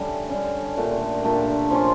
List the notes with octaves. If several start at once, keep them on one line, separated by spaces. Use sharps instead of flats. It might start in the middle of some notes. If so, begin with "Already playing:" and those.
Already playing: D3 G3 A3 C#4
D3 G3 C#4
A#2 A3 D4 G4
A#2 A3 D4 G4
F3 C#4 F4